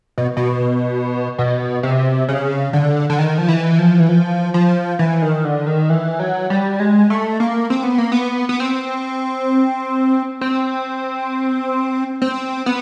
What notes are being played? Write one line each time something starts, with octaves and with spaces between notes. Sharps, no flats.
B2
B2
B2
C3
C#3
D3
D3
D#3
F3
E3
F3
E3
F3
F3
E3
D#3
D3
D#3
E3
F#3
G3
G#3
A3
A#3
C4
B3
A#3
B3
B3
C4
C4
C4
B3